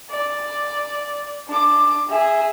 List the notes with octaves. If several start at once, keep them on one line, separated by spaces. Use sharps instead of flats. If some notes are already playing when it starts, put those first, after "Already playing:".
D5
D4 D6
G#4 E5